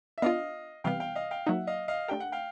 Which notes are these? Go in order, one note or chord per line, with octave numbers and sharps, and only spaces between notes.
E5
B3 D4 F4 D#5 F5
C3 E3 G3 B3 F5 G5
F5 G5
D#5 F5
F5 G5
F#3 A#3 D#4 E5 F#5
D#5 F5
D#5 F5
A3 D4 G4 A#4 G5
F#5
F5 G5